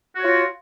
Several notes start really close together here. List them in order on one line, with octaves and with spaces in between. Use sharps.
F#4 C#5 F4